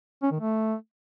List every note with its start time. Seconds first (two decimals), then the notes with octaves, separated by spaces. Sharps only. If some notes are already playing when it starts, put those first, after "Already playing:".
0.23 C#4
0.31 D#3
0.40 A3